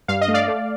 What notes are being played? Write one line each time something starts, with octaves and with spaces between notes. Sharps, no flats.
G2 F5
D#5
A3
D5 F5
A3